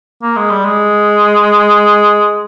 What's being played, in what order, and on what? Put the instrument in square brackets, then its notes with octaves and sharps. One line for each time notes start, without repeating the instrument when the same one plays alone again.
[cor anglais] A#3
G#3
G3
G#3